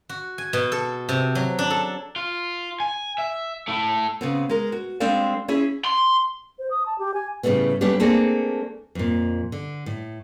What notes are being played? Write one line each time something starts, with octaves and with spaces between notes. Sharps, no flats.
F#4
G#5
B2
A4
C3
F#3
D4
A4
F4
G#5
E5
A3 E4
C#3 B3 C4
G#3 A#4
F#4
G3 G#3 C4 D4 A4 F5
C#4 E4 G#4 E5
C6
C5
D#6
A5
G4
G#5
A2 C#3 E3 G3 A3 B3
G3 A3 B3 C#4 D4 G4
A3 A#3 C4 D4 G#4 A4
F2 A#2
D3
A2